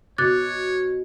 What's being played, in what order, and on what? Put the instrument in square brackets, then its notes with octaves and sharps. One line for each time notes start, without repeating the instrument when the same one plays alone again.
[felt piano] B2 [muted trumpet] C#5 [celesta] D6 F#6 A6